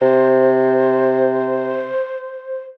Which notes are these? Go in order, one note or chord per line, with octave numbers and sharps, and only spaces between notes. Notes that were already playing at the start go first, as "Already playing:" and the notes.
C3 C5